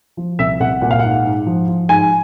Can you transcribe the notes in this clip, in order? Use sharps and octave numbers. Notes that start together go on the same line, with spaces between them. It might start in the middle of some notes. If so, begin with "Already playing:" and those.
F3
C2 E5
C2 F#5
A#2 F#5
F5
G#2 F#5
G#2
F3
F3
G#2 G#5